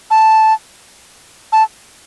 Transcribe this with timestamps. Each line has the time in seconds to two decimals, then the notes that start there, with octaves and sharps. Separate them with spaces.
0.11 A5
1.52 A5